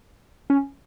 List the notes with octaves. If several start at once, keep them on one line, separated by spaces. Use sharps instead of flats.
C#4